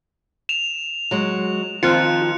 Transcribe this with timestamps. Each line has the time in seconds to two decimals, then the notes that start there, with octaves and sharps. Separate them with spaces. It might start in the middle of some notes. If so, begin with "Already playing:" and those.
0.49 E7 F7
1.11 F#3 G#3
1.83 D#3 F3 C4 F4 F#6 C#7